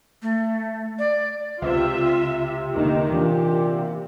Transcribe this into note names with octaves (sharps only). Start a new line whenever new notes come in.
A3
D5
C#2 C3 F4 E5
E1 D3 D#3 A#3 D#4
A#2 E3 D4 G4